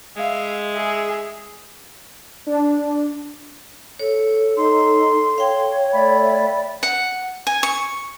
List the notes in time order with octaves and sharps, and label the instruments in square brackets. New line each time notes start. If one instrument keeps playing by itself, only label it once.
[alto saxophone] G#3 [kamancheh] E5 F5
[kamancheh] G#4 E5
[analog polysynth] D4
[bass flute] A4 [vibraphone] C#5
[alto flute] D#4 [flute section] C6
[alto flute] C#5 [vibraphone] F5 G5
[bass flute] A3 [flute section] D5 E5 B5
[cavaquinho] F#5
G#5
C#6